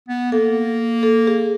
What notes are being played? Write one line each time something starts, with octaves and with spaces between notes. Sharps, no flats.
B3
A#3 A4
A4
G#4